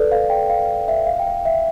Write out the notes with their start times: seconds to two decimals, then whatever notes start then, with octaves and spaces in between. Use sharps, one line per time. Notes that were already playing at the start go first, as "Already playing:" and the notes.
Already playing: A4 B4 D5
0.12 F5
0.30 G5
0.50 F5
0.88 E5
1.07 F5
1.19 G5
1.27 F5
1.45 E5